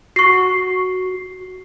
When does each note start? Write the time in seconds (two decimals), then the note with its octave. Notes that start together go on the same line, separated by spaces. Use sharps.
0.16 F#4 C#6 C7